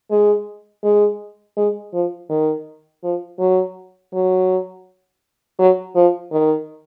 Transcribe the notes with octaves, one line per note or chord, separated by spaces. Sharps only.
G#3
G#3
G#3
F3
D#3
F3
F#3
F#3
F#3
F3
D#3